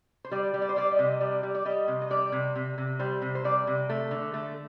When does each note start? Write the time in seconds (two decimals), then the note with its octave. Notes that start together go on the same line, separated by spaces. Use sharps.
0.25 C5
0.32 G3 D5
0.54 G3
0.62 D5
0.69 C5
0.76 G3 D5
0.91 D#5
0.99 C3
1.06 D#5
1.21 G3 D5
1.43 G3
1.55 D5
1.65 G3 D#5
1.88 C3
2.01 D#5
2.10 G3 D5
2.32 C3
2.56 C3
2.78 C3
2.99 G3 C5
3.22 C3
3.35 C5
3.44 G3 D5
3.67 C3
3.89 A3
4.11 D3
4.34 A3